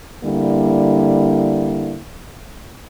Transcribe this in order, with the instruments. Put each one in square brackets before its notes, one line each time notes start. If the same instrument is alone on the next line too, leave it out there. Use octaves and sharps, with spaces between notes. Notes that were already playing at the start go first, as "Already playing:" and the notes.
[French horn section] D3 G3 A#3 E4